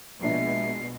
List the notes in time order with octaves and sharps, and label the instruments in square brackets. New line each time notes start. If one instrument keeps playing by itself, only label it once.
[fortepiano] A#1 D4 [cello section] B2 G#3 [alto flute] E5 [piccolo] C7